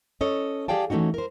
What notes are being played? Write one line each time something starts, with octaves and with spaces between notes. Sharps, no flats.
C#4 A4 C#5 D#5
G4 G#4 D5 F5 G5 A5
E3 A3 C#4 D#4 F#4
A#4 C5